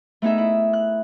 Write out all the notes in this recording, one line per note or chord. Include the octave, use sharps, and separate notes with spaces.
A3 B3 D#4 G#4 E5
E4
F#6